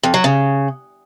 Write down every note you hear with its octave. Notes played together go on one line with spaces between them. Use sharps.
F2
F#3
C#3